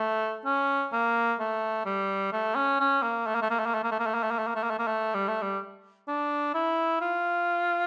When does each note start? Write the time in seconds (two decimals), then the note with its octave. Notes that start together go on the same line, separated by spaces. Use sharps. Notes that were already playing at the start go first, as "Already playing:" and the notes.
Already playing: A3
0.45 C#4
0.93 A#3
1.40 A3
1.86 G3
2.33 A3
2.56 C#4
2.80 C#4
3.03 A#3
3.27 A3
3.35 A#3
3.42 A3
3.50 A#3
3.59 A3
3.66 A#3
3.74 A3
3.83 A#3
3.91 A3
3.99 A#3
4.06 A3
4.14 A#3
4.23 A3
4.31 A#3
4.39 A3
4.47 A#3
4.55 A3
4.63 A#3
4.71 A3
4.79 A#3
4.87 A3
5.14 G3
5.28 A3
5.42 G3
6.08 D4
6.54 E4
7.01 F4